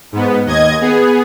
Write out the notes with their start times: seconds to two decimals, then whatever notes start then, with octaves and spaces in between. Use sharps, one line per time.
0.12 G#2 B3
0.45 D#2 D#5 G#6
0.81 B3 G#4